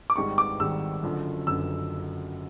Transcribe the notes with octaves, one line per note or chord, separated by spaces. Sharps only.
D6
G#1 G#2 D#3 G3 C#6
D6
G#1 G#2 D#3 G3 E6
F#1 F#2 D3 F3
F#1 F#2 D3 F3 E6